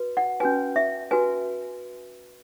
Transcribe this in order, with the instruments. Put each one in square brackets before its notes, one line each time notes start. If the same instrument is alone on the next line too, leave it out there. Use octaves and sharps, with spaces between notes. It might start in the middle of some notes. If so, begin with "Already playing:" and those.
Already playing: [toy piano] F#4 B4
F#5
C#4 F#4 B4 G#5
E5
F#4 B4 G#5